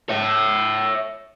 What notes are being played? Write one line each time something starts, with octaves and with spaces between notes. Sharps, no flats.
C#5 E5